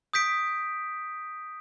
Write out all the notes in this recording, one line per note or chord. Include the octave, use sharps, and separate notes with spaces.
D#6 G6 B6 D7